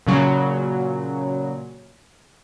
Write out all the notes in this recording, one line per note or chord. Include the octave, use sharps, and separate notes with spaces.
A#2 C#3 F#3